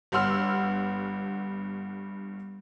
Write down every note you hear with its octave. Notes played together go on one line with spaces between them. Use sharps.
G1 G2 F#5 C6 E6 F6